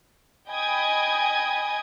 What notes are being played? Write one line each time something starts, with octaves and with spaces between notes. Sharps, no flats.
D#5 G5 G#5 B5 D#6 G#6